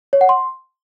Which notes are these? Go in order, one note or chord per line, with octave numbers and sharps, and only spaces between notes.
C#5
F#5
C6